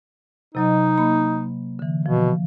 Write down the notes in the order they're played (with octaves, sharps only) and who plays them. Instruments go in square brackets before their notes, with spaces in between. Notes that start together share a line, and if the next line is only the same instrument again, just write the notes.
[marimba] C3 F#3 D#5 [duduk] D#4
[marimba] A#3 B5
D3 E3
[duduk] B2 [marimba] F3